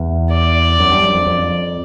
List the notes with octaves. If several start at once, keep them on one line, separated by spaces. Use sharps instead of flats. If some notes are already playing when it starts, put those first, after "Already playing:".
Already playing: E2
D5
F#2
G2
F#2
F2
F2